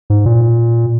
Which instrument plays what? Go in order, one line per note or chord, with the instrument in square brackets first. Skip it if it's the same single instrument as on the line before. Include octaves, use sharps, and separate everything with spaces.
[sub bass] G#2
A#2